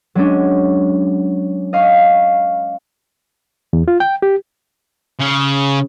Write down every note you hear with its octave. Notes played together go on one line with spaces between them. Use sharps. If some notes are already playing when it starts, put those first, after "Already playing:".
F#3 G#3 C#4 D4
D#5 F5 C#6
E2
F4
G5
G4
C#3